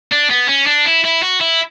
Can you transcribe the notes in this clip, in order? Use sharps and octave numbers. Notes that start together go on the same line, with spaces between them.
D4
B3
C#4
D4
E4
E4
F#4
E4